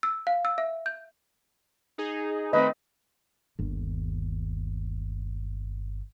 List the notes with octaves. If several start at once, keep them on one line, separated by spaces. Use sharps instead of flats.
E6
F5
E6
E5
G6
D#4 G#4
D#3 A3 C4 B4 D#5
G1 D#2